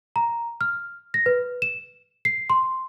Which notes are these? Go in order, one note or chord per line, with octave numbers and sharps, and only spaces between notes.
A#5
F6
A#6
B4
E7
C7
C6